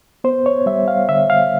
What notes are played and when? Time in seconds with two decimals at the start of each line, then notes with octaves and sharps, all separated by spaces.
0.24 B3 C5
0.46 C#5
0.66 G3 E5
0.88 F5
1.09 D3 E5
1.30 F5